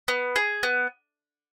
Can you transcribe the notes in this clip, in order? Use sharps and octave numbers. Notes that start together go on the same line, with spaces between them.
B3
G#4
B3